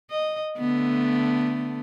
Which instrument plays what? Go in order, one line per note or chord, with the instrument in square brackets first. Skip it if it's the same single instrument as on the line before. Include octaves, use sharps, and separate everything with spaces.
[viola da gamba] D#5
D3 A3 B3